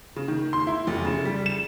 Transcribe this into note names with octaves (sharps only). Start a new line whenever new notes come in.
C#3
D#3
C6
E4
F1
C#3
G3
E7